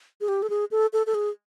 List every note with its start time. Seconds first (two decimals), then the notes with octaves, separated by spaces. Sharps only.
0.21 G#4
0.28 G4
0.42 A4
0.50 G#4
0.71 A4
0.93 A4
1.07 A4
1.14 G#4